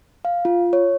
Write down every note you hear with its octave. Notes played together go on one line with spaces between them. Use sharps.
F5
F4
C#5